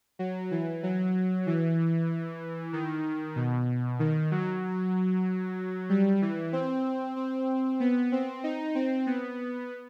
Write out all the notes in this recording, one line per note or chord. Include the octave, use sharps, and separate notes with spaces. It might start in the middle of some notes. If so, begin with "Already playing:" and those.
F#3
E3
F#3
E3
D#3
B2
D#3
F#3
G3
E3
C4
C4
B3
C4
D#4
C4
B3